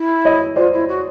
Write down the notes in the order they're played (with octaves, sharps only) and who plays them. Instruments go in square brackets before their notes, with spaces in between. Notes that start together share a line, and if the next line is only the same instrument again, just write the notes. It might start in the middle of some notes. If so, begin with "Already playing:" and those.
Already playing: [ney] E4
[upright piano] C#5 D#5
[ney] F4 [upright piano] C5 D5
[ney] E4
F#4